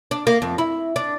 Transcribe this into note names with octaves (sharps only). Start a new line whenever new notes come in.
D4
A#3
F2
E4
D4